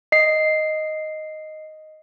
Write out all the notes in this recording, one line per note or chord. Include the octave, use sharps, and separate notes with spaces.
D#5 C7